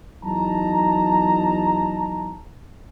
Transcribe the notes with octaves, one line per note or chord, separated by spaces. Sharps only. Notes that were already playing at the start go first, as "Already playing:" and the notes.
E2 F#3 D#4 A5 A#5